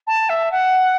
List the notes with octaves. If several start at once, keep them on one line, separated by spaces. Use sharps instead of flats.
A5
E5
F#5